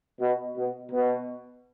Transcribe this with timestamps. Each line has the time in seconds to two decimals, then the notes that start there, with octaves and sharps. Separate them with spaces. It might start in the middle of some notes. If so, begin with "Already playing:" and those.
0.20 B2
0.57 B2
0.92 B2